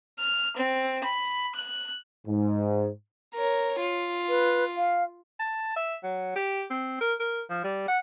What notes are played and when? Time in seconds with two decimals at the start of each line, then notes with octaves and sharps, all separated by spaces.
0.19 F6
0.57 C4
1.04 B5
1.55 F#6
2.27 G#2
3.35 A#4 C#5
3.80 F4
4.29 B4
4.77 F5
5.40 A5
5.76 E5
6.03 F#3
6.35 G4
6.70 C4
7.01 A#4
7.20 A#4
7.50 F3
7.64 G3
7.88 F#5